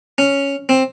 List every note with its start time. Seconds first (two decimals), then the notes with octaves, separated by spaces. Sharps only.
0.18 C#4
0.69 C4